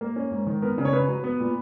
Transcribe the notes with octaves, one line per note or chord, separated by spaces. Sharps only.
A#3
C#4
G#2
D#3
B3 A#4
C#3
C#5
C#3 B4
F#3
B3
A#2